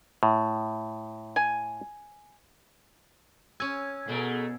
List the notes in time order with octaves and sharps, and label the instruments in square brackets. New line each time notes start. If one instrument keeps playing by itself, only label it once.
[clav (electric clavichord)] A2
[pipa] G#5
[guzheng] C#4 G#5 [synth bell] E6 G#6
[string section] B2 [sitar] A3 G#4 A#4